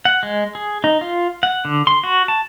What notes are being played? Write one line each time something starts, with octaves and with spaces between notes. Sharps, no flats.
F#5
G#3
G#4
D#4
F4
F#5
D3
C6
F#4
A5